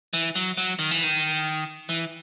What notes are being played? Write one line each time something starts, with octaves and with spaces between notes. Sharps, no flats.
E3
F#3
F#3
D#3
E3
D#3
E3